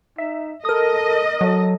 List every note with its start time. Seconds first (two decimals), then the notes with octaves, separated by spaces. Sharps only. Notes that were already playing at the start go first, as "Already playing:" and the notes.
0.18 D#4 E5
0.65 A4 A#4 D#5 D#6
1.41 F#3 A4